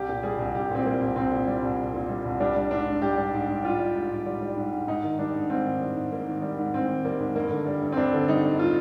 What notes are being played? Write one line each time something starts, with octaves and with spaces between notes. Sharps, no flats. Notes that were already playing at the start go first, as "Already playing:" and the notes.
Already playing: C2 G4
A#2
G3 G#4
C2
C2 G4
A#2 C4
G3 A#3
C2
C2 C4
A#2
G3
C2
C2
A#2
G3
C2
G3 D4
G3
G#2 D4
G#2
G3 G4
G3
G#2
G#2
G3 F4
G3
G#2
G#2
G3
G3
G#2
G#2
G#2 D#4
D#3
G3 D4
G#2
G#2 C4
D#3
G3
G#2
G#2 A#3
D#3
G3
G#2
G#2 C4
D#3
G3 A#3
G#2
G2 A#3
D3
G3
G2
C4
G2 D4
D3
G3 D#4
G2
F4